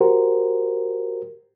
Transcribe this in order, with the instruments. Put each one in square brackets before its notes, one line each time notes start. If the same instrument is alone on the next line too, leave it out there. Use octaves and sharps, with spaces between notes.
[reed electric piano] F#4 G4 A#4 C5